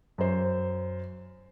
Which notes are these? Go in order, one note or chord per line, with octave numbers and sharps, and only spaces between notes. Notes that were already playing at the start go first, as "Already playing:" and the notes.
F#2 C5